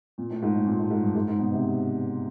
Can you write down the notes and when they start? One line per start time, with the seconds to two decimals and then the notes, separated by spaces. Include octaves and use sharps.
0.18 A#2
0.30 A2
0.42 G#2
0.55 A2
0.66 A#2
0.79 A2
0.90 G#2
1.02 G2
1.15 G#2
1.28 G#2
1.39 B2
1.52 C3